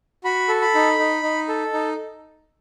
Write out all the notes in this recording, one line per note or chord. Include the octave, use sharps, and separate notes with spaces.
F#4 B5
A4
B5
D#4
D#4
D#4
A4
D#4